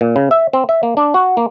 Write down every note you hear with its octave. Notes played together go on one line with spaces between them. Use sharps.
A#2
C#3
E5
C4
E5
A#3
D4
F#4
A#3